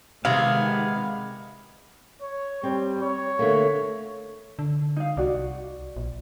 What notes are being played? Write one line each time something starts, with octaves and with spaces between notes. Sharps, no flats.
C3 D#3 G#3 B3 G#4 F5
C#5
G3 C4
C#5
D3 A3 A#3
D3
D#4 F5
C2 F#4 D5
A#1